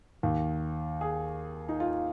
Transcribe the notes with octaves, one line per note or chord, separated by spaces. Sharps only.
D#2 D#3
G#4
D#4
F4